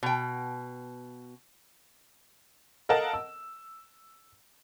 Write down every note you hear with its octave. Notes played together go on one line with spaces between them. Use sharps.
B2 G5
A4 A#4 D#5 F5 F#5 A5
E6